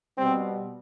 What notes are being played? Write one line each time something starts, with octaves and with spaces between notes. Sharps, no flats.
B2 G3 C4